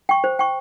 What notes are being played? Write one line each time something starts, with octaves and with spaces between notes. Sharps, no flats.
G5 C#6
C5
G5 C#6